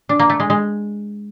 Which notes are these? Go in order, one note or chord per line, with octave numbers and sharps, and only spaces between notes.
D4
A#3
A3
G#3
G#3